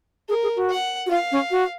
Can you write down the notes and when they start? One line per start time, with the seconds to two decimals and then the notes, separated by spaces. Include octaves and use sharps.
0.29 G#4 A#4
0.43 G#4
0.56 F#4
0.70 F#5
1.06 F#4
1.10 F4 F5
1.32 C#4
1.51 F#4